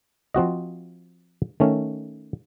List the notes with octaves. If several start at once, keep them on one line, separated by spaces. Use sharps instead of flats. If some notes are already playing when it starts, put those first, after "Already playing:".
F3 C4 F#4 D#5
D#3 A3 C#4